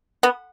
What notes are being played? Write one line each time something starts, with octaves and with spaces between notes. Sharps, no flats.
B3